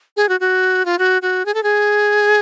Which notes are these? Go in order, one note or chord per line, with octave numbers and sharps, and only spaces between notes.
G#4
F#4
F#4
F4
F#4
F#4
G#4
A4
G#4